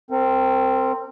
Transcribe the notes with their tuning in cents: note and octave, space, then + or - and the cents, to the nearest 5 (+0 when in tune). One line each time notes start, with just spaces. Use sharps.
C4 +0 A#4 -35